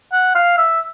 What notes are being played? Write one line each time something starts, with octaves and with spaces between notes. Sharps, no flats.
F#5
F5
E5